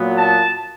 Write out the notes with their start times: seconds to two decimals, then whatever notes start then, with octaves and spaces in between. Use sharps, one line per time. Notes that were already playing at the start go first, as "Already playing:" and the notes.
Already playing: A#2 F#3 B3
0.18 A5